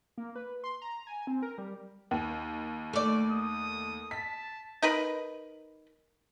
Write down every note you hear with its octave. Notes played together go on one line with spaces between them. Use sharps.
A#3
B4
C6
A#5
G#5
C4
A#4
G3
D#2
A3 D5
D#6
A5 B6
D#4 A#4 B4 B5